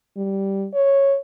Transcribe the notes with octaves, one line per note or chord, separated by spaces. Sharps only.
G3
C#5